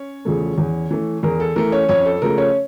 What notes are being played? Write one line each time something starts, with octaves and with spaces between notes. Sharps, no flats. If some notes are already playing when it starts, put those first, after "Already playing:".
Already playing: C#4 C#5
E2 C#3 F3 A3
E2
E3 A3
E2 A#4
A4
E3 A3 A#4
C#4 C#5
F2 C#4 C#5
A4
C#3 F3 A3 A#4
C#4 C#5